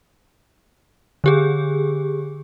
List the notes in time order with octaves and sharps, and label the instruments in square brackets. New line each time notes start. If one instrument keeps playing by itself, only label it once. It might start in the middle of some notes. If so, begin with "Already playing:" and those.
[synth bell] D3 G4 G#4